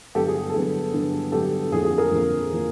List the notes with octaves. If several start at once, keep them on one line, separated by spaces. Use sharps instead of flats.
G2 D3 F#3 B3 G4 A4
G#4
A4
G2 D3 F#3 B3 G#4
G2 D3 F#3 B3
G2 D3 F#3 B3 G4 A4
F2 D3 F3 A#3 G#4
G#4
G#4 A#4
F2 D3 F3 A#3
D3 F3 A#3